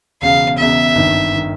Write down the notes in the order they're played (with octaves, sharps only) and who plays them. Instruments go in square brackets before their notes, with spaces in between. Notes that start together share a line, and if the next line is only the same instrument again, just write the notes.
[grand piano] E1 E2 C#3 [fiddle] F5
[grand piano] E1 E2 C#3 [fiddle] E5
[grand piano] G#1 G2 D#3
D#3